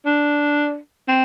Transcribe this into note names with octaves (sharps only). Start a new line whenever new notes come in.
D4
C4